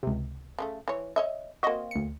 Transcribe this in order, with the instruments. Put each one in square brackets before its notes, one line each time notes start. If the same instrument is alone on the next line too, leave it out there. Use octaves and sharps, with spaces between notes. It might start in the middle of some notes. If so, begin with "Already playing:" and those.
[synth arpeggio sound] C#2 C3
[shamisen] C#3 F3 A3
E3 C#5
C#5 D#5 E5
[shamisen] A#3 C4 [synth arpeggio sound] F#4 D#5
[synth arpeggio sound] D2 C#7